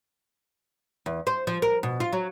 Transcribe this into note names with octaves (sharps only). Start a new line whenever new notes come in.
E2
C5
F3
A#4
B2
F4
F#3